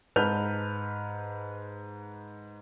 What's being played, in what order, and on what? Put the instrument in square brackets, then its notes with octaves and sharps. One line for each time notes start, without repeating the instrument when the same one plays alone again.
[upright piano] G#2 B4 A5 F6 G6 F7